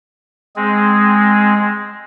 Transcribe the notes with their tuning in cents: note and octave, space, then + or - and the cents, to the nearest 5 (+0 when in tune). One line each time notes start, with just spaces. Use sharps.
G#3 +0 C4 +0 G#4 +0